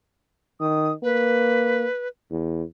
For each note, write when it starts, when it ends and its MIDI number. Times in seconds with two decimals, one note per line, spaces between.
0.60 0.92 51
0.60 0.92 87
1.03 1.85 58
1.03 2.08 71
2.31 2.63 40